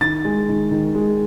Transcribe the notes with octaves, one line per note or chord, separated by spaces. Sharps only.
D#3 A6
G#3
D#3
D#3
G#3